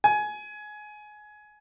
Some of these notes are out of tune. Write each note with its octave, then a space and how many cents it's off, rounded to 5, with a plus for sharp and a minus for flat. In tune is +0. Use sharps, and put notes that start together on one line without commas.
G#5 +20